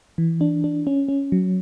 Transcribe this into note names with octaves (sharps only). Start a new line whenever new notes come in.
E3
D4
D4
C#4
C#4
F#3